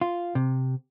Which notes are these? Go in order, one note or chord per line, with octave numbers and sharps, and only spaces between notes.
F4
C3